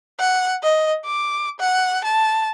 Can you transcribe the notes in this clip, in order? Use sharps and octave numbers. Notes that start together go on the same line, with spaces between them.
F#5
D#5
D6
F#5
A5